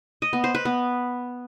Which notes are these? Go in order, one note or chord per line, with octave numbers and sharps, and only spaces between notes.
D#5
B3
C5
B4
B3